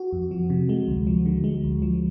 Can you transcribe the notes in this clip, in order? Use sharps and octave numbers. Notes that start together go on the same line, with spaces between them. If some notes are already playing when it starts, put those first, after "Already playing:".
Already playing: F#4
F2
F3
C3
G#3
D2
F3
D3
G#3
D2
F3